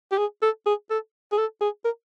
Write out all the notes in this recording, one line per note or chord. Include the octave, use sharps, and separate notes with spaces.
G4
G#4
A4
G#4
A4
G#4
A4
G#4
A#4